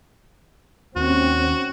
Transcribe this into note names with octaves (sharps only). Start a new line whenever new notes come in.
D#2 C4 C#4 F#4